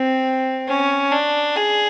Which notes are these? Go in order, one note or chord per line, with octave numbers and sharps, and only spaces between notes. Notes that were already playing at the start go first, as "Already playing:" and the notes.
Already playing: C4
C#4
D4
G#4